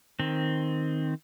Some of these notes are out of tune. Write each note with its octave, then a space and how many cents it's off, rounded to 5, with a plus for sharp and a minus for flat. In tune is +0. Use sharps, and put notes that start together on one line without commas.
D#3 +0 C4 +0